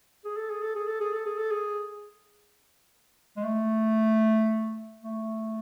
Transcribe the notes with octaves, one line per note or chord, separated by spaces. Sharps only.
G#4
A4
G#4
A4
G#4
A4
G#4
A4
G#4
A4
G#4
G#3
A3
A3